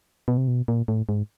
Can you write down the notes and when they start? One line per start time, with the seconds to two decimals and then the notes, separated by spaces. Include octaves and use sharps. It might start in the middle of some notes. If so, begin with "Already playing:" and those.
0.28 B2
0.37 C3
0.48 B2
0.68 A#2
0.88 A2
1.09 G#2